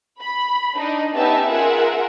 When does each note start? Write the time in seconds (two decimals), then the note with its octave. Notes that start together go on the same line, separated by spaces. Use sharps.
0.21 B5
0.76 D4 D#4 D#5
1.15 B3 C#4 D#4 G4 E5 A5
1.49 F4 G#4 A#4 E5 F#5